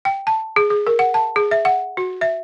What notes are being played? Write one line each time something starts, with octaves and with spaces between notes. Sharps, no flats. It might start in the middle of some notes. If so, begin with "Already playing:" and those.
G5
A5
G#4
G#4
A#4
F#5
A5
G#4
E5
F#5
F#4
E5